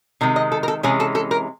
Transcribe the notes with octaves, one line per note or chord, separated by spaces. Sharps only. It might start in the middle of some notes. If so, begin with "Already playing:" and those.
C3 D#3 G#3
D#5
A4
A#4
A4
C3 E3 G#3 C#4 G#4
A4
A4
A#4